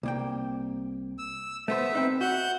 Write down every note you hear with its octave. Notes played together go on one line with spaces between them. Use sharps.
C2 A#3 G5
E6
A3 B3 C5 E5
C4 D#4 B4
F#4 F#5 G6